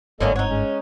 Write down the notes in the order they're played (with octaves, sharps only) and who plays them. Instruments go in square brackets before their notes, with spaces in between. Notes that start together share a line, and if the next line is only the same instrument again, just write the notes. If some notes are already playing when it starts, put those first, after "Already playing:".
[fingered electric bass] G1 G#2 [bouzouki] D3 F#3 C#4 [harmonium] A#3 A4 D#5
[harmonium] C4 F#5 [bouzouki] D#4 C#5
[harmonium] G#3 C#4